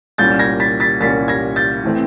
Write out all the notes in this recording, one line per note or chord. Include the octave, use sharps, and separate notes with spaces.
C2 A#2 G3 A#3 C#4 G6 A6
G#6 A#6
A6 B6
A6 B6
C2 A#2 G3 A#3 C#4 A6 B6
G#6 A#6
G6 A6
A2 E3 A3 C4